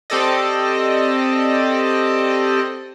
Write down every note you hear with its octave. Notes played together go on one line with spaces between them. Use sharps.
C4 G4 A4 D5 D#5